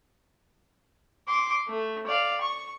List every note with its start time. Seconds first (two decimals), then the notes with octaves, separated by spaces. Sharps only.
1.28 C6 D6
1.68 A3
2.07 D5 F5
2.41 C#6